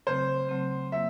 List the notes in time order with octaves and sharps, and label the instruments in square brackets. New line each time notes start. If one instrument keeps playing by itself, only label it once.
[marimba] C#3 F#3 A3 C4 [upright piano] C5
[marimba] C#3 F#3 A3 C4
[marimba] F#3 A#3 [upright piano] E5